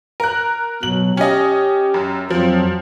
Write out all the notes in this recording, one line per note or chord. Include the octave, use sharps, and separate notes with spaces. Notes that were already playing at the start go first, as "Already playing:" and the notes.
A#4 F#6
B2 F#3 F#7
C#4 G4 D#5
F#2
F2 F3 F#3 C4